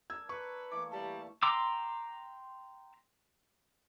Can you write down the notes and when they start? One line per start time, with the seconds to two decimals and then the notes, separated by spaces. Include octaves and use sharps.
0.10 D4 A#4 E6 G#6
0.29 B4 C#6
0.71 E3 A3 A#3 D6
0.91 G3 F5 A5
1.43 G5 A#5 C6 D6 E6